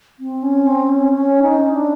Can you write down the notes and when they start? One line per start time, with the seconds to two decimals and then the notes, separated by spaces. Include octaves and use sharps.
0.19 C4
0.43 C#4
0.66 C4
0.89 C#4
1.12 C#4
1.42 D#4
1.73 D4